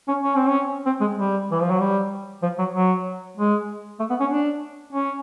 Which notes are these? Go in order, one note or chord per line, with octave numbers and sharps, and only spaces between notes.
C#4
C#4
C4
C#4
C4
G#3
G3
E3
F3
F#3
G3
F3
F#3
F#3
G#3
A3
B3
C#4
D4
C#4